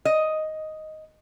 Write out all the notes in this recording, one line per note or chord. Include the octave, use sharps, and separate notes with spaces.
D#5